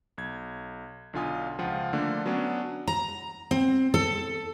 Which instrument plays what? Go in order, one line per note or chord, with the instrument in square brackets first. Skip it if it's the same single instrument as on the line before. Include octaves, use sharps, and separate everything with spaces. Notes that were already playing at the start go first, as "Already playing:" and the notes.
[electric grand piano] B1 G#6
B1 D3 F4 G#5 D#6
C#2 F3 F4 F#5 G5
D3 F3 A3 A#3 D4
F#3 B3 C#4 D4
[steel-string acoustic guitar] A#5
C4
A4